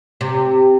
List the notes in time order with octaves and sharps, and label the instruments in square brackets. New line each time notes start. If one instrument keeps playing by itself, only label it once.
[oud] C3